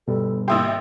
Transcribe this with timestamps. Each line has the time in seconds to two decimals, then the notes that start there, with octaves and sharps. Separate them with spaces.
0.08 G1 B2 G3 A4
0.48 G#1 A#3 E4 G4 C6 D#6 E6